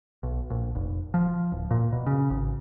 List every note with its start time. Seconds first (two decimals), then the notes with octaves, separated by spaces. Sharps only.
0.23 B1
0.50 A#1
0.75 F1
1.14 F3
1.52 D1
1.71 A#2
1.92 B2
2.06 C#3
2.30 G#1